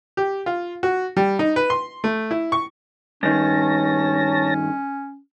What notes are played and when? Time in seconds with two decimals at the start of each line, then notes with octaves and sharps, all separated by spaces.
0.17 G4
0.46 F4
0.83 F#4
1.17 G3
1.39 D#4
1.56 B4
1.70 C6
2.04 A3
2.31 E4
2.52 C#6
3.23 G2 D#3 C#4 C#5 A5 A#6